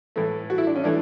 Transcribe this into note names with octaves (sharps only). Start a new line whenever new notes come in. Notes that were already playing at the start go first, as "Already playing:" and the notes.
A2 E3 A3
F#4
E4
D4
C#4
E3 A3 D4